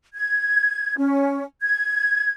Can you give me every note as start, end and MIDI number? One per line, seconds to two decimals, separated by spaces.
0.14 0.96 92
0.97 1.43 61
1.61 2.33 92